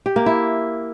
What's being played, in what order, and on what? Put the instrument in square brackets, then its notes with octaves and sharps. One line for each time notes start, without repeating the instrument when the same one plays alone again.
[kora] G4
A#3
E4